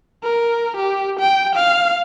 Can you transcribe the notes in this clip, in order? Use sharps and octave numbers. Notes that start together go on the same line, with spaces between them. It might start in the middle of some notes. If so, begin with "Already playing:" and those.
A#4
G4
G5
F5